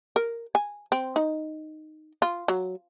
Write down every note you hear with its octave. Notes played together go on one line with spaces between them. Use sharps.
A#4
G#5
C4
D#4
F4
F#3